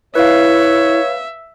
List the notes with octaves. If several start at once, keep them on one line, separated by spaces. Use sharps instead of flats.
E4 B4 C#5 E5 F5